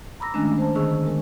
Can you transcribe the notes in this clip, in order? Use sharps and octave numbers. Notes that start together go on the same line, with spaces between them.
A#5 B5 D6 E6 A#6
D#3 G#3 A3 C#4 D4
C5 A5
D3 D#3 B3 G#4 C#6 E6
G#3 A#4